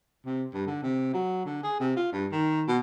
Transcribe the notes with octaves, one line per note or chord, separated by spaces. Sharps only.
C3
G2
D3
C3
F#3
D3
G#4
C3
F4
G2
D#3
B2